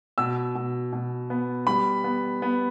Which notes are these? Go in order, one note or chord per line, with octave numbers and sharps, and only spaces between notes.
B2 E6
B2
B2
B3
G3 B5
B3
B3